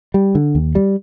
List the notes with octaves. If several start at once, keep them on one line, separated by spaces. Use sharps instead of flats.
G3
D3
D#2
G3